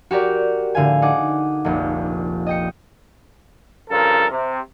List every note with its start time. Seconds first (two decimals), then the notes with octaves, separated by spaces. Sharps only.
0.11 F#4 G4 A#4 D5
0.75 A2 D3 F5 G#5
1.02 D#4 G#4 F#5 D6
1.65 F1 A#1
2.47 D#5 G5 C#7
3.90 G2 C#3 F3 A4 A#4
4.30 C3